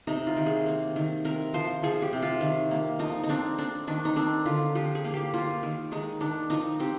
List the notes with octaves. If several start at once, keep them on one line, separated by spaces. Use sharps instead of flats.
C3 D#4
F4
D#3
G#4
A#3
D#3
C4 A#4
F3 C5
F3 G#4
G4
C3
F4
D#3
A#3
F3 D#4
D#4
C4 D4
C4 D4
D#3 D4
D#4
C4 D4
D3 F4
F3 G4
G#4
A#3
G4
A#3 F4
D#3
G#3 D#4
D#3 D4
F3 D#4
C4 G4